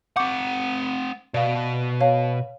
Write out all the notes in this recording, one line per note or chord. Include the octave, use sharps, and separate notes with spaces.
C4 F#5 C#6 D6 G6
B2 D5 F5
C#5 F5 A5